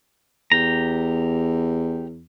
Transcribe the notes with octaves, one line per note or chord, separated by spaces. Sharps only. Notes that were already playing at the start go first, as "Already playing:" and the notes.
E2 G4 A#5